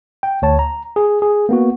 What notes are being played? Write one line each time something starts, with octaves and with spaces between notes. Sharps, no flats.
G5
D2 C#5 A5
A#5
G#4
G#4
A#3 B3 F#4